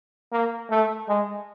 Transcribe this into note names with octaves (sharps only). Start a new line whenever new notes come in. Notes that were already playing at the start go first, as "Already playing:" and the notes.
A#3
A3
G#3